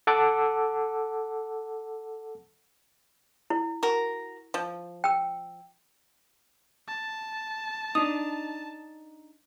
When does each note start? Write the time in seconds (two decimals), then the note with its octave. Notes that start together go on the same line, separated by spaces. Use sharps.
0.07 A4 F#5 A5 D6 E6
3.50 E4
3.83 F#4 A#4
4.54 F3
5.04 G5 E6
6.88 A5
7.95 D4 D#4 D#6